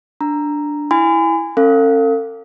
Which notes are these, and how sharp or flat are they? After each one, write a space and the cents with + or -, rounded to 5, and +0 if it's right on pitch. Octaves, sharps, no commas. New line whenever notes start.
D4 +0 A#5 +0
E4 +0 G#5 -15 B5 +40
C#4 -35 A4 +40 F5 -10